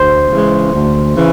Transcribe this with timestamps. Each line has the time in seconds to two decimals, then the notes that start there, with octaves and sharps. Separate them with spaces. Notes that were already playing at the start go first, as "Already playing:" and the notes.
Already playing: D2 C5
0.30 C#3 E3 G#3
0.73 D2
1.15 C#3 E3